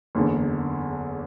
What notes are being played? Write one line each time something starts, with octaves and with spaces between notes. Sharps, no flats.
F#1 E2 D3